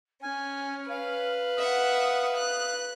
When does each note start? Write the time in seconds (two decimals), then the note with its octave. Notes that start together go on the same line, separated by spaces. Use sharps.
0.23 C#4 G#5 F6
0.90 B4 F5
1.56 E5 F#5 D#6
2.35 F#6